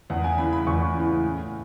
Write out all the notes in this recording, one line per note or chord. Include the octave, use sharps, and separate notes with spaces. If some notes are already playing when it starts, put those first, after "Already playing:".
E2 F#5
G#5
C#3 E3 B5
B5
E2 C#6
C#3 E3
A2